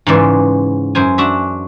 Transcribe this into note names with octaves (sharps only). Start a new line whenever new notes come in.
G#2 C#3 E3 D5 C6
F#2 C5 G#5
D4 F#4 E5